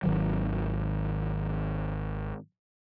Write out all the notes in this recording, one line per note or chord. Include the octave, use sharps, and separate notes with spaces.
G#1 D#3 F#3